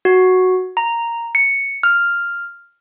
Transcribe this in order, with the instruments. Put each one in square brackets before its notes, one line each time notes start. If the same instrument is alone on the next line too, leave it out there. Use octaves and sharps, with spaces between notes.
[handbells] F#4
A#5
C#7
F6